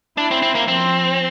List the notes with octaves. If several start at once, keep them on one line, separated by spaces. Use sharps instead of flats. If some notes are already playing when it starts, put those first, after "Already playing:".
D4 E4
C4
C4
A#3
F3 C4